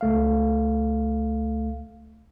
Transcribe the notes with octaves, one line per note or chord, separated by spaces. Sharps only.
C#2 A3 F5